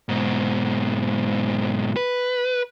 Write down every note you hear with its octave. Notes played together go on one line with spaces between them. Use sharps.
G#2 B2
B4